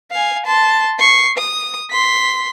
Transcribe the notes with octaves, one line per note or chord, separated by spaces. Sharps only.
F5 G#5
A5 C6
C#6 C7
D#6
C6 B6